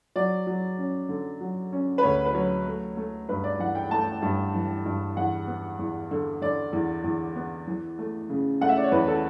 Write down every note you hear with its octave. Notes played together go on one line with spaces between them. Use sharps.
F#3 D5
F#3
C#4
D3
F#3
C#4
B4
D2 C#5
B4
F#3 C#5
A3
A3
G2 B4
D5
E3 F#5
G5
A3 A5
G2
E3
G2
E2 F#5
B3
E2
D3
D3 D5
E2
E2
B3
E3
A3
C#3
A3 F#5
E5
D5
C#5
E2 B4
A4